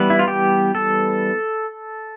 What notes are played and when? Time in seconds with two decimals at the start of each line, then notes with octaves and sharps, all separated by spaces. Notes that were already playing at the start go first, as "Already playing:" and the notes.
Already playing: E3 G3 B3 B4
0.10 E4
0.19 F4
0.28 G4
0.75 A4